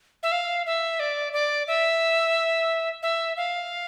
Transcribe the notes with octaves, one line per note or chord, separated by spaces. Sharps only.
E5
F5
E5
D5
D5
E5
E5
F5